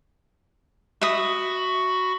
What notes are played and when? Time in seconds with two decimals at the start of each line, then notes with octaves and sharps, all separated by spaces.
1.01 F#4 E5 B5 C#6 D#6